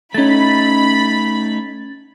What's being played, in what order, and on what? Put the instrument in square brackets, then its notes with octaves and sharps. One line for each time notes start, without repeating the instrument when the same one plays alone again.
[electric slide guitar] A3 D#4 [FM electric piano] C#4 A6 [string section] B5